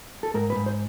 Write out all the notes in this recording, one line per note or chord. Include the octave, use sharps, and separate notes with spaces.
A4
G#2 A#4
B4
G#2
C5